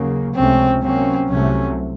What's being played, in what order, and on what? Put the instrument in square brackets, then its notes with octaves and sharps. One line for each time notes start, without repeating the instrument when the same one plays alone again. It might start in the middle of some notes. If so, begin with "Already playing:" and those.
Already playing: [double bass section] D#2 C#3 F#3 A#3
[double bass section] C#2 C3 F3 A3 C#4 [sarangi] C4
[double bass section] C3 F#3 A#3 C#4 [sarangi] C4
[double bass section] C2 C3 F#3 A3 [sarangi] C#4